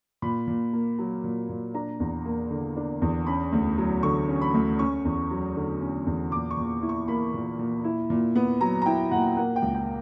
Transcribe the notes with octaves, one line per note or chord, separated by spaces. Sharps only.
A#2 B5
A#2
A#3
F#3
A#2
A#2
D4 A#5
E2
A#3
D3
D4
E2
C#4 B5
D2
F#3
D3 C#6
C#4
B5
D2
C#4 C#6
E2
F#3
D3
C#4
E2
A#2 D6
C#6
A#2
E4
C#6
A#3 B5
A#2
A#2
E4
A#2
B3
F#3 A#5
A#5
E4 G5
A#2 F#5
A#3 F#5
G5
C#2
G5